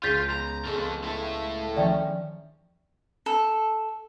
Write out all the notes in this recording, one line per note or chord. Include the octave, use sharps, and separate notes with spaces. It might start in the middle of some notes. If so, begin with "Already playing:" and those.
C#2 F4 G6 A6 B6 D7 D#7
B3 A#5
C#2 A3 F4 A4
E4 A4 F5
D#3 F3 C#4 D5 E5 G5
A4